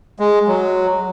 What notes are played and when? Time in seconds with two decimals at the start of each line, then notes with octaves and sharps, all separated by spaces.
0.19 G#3
0.47 F#3